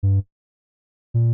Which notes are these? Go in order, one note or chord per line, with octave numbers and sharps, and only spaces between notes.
G2
A#2